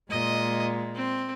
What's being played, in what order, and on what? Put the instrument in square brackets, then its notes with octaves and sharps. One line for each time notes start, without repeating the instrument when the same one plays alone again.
[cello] A#2 G#3 [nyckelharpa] D#5
[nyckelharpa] C4